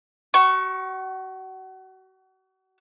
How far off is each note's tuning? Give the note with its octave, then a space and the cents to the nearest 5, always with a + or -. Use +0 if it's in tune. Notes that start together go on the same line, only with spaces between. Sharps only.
F#4 +35 C#6 +0